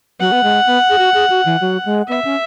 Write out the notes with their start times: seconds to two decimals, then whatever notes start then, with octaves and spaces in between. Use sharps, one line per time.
0.20 F#3 F#5
0.32 B3
0.44 G#3
0.67 B3
0.90 G#4
0.98 F#4
1.14 G#4
1.30 F#4
1.45 E3
1.61 F#3
1.86 G#3
2.08 B3 E5
2.25 C#4